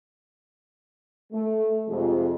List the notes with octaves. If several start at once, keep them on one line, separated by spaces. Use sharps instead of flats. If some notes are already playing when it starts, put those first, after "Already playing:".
A3
F2 C3 F3 G#3 G#4